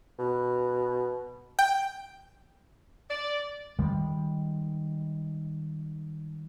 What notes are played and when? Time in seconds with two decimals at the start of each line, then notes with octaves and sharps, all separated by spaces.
0.19 B2
1.59 G5
3.09 D5
3.79 D#3 G3 G#3